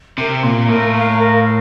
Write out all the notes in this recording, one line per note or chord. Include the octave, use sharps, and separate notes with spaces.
C3 A#4
A#2 F5 A#5
A2 A#4
F5 A#5
A#4
F5